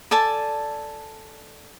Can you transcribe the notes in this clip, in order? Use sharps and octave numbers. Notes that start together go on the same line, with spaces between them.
A4 D5 G#5 A5